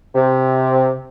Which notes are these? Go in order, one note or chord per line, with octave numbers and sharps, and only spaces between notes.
C3